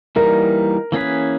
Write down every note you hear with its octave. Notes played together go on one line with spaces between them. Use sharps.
E3 G3 A#3 D#4 A#4
E3 A#3 C#4 G#4 B4